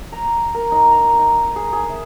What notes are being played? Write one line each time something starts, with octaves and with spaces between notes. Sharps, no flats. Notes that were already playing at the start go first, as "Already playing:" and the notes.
A#5
A#4
D#4
A#5
D#4
G#4
G#4
E5